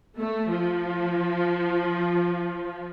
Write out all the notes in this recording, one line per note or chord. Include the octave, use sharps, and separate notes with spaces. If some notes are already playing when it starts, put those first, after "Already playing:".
A3
F3